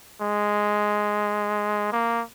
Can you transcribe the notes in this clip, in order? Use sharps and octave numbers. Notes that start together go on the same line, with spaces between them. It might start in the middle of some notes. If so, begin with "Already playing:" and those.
G#3
A#3